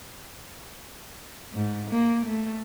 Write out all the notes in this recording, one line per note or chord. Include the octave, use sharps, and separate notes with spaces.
G#2
A#3
A3